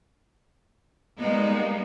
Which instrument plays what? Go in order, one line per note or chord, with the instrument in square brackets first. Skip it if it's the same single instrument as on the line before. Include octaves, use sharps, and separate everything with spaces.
[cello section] G3 G#3 A#3 B3 D#4